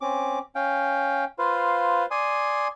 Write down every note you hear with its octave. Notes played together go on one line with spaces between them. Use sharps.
C4 C#4 D6
C#4 F5 G5
F4 B4 C5 F5
D5 G#5 C6 D#6